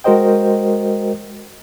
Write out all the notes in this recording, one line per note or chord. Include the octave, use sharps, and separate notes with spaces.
G#3 F#4 A#4 C5 D#5 G5